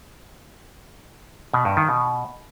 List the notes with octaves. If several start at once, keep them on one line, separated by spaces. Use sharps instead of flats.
B2
G2
D#3
B2